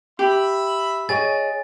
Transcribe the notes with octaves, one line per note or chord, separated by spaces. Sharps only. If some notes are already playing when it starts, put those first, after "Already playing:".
G4 E5 B5
G#4 C#5 D#5 G#5 A6